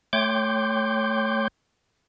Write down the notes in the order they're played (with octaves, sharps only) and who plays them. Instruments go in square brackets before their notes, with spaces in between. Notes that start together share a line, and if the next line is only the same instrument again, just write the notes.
[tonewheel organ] A3 C#5 G5 C6 D6 G6